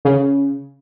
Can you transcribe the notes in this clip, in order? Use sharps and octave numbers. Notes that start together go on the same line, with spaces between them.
C#3